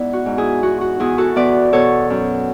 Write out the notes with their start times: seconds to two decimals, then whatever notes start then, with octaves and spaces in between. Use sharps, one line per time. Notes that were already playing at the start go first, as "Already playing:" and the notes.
Already playing: G#2 B3 E4 D5
0.13 F#4
0.26 G#2
0.38 E4 G#4
0.63 E2 F#4
0.81 F#4
1.00 E2 E4 G#4
1.18 F#4 A4
1.36 E2 B4 D5
1.73 B2 A4 C#5
2.10 F#2